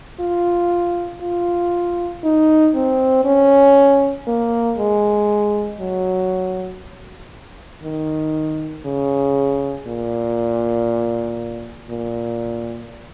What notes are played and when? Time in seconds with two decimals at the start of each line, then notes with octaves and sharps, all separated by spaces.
0.20 F4
1.21 F4
2.24 D#4
2.75 C4
3.25 C#4
4.27 A#3
4.78 G#3
5.80 F#3
7.83 D#3
8.85 C#3
9.87 A#2
11.90 A#2